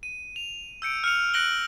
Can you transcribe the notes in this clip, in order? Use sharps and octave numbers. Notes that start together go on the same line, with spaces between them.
D#7
F7
E6 G6 C#7 D7
F6 C#7 F7
F#6 A#6 C#7 D7 F#7 G7